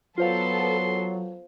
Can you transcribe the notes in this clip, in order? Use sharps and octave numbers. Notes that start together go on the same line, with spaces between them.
F#3 B3 F4 A4 C5 F5 C6